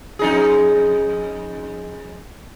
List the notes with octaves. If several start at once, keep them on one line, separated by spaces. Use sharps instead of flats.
F2 D#4 G#4